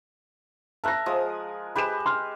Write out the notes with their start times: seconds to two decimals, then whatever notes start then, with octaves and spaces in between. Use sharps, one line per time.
0.84 A#4 E5 A5 F#6 A#6
1.06 F3 G#3 D#6
1.75 G#3 G4 B4 B5 E7
2.06 C6 F6